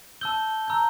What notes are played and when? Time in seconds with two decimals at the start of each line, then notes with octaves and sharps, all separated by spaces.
0.21 A5 E6 G6 G7
0.68 A#5 E6 G6